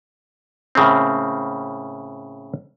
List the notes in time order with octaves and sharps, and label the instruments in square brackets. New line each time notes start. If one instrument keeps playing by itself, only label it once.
[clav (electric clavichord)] A2 C#3 A#3 C4